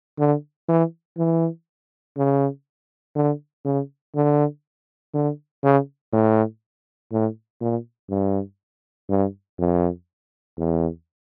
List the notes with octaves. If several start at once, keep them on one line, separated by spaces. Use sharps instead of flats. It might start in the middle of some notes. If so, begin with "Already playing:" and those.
D3
E3
E3
C#3
D3
C#3
D3
D3
C#3
A2
A2
A#2
G2
G2
F2
E2